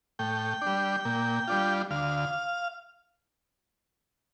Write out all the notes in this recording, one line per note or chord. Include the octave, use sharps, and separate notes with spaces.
A2 G5
G3 D4
A#2
G3 D4 F4
D2 F5